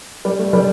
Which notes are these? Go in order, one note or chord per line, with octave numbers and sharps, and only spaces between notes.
G3
A3
G3